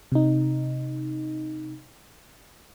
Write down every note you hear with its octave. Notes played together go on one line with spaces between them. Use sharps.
C3 D#4